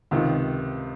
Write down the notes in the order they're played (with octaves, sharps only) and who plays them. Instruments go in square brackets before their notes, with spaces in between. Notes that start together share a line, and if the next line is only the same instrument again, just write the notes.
[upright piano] C#2 C3 D#3